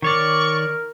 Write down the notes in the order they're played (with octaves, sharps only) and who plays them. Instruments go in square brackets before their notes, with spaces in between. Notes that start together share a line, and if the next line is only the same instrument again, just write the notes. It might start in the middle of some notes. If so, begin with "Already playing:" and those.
[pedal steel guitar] D#3 C#5 D5 [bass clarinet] A#4 [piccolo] C#6